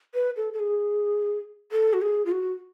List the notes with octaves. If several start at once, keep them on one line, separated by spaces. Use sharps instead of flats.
B4
A4
A4
G#4
A4
F#4
G#4
F4
F#4